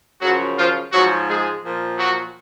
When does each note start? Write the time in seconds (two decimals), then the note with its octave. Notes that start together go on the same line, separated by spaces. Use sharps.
0.20 F#2 C#3 F3 F#3 F#4
0.56 F3 F4
0.91 G#2 F3 F#3 F#4
1.27 G#3 G#4
1.63 A#2 F3
1.98 F#3 F#4